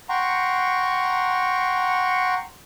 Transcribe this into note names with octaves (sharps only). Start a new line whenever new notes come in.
F#5 G5 A#5 C6 C#6